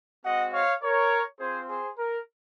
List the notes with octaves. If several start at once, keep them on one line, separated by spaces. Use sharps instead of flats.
G#3 C4 F#4 D#5 F#5
C#5 F5
A#4 C#5
C4 F4 G#4 C5
G#4 C5
A#4